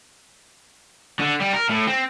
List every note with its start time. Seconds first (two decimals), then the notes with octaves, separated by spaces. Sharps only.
1.19 D3
1.40 G3
1.53 A#4
1.69 A2
1.87 C4